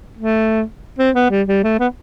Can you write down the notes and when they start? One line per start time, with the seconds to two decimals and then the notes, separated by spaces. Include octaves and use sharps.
0.17 A3
0.99 C4
1.15 B3
1.31 G3
1.48 G3
1.64 A3
1.79 B3